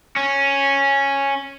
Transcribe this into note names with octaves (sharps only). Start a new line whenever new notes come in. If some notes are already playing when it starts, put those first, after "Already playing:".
C#4